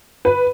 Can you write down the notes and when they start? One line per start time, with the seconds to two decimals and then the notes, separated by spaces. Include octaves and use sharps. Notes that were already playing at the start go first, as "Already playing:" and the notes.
0.25 B4